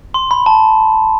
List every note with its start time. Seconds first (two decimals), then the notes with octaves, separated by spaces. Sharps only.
0.14 C6
0.31 B5
0.46 A5